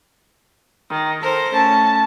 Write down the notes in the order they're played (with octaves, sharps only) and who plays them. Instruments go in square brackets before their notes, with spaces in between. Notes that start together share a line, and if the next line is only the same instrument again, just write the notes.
[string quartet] D#3
A4 A#4 C5
[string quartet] A2 C#4 [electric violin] A5